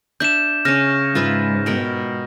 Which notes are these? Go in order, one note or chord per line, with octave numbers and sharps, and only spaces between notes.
D4 E5 G6 E7
C#3 C#4 F6 A#6
G#2 F4 B4 E5
B2 A#4 G5